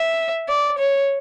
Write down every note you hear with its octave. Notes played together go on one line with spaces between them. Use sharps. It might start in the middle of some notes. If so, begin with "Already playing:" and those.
Already playing: E5
D5
C#5